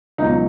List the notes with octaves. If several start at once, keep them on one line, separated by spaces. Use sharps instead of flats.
C#2 B2 F#3 D#4